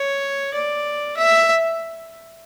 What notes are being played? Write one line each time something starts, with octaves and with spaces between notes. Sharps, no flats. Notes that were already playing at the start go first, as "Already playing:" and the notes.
Already playing: C#5
D5
E5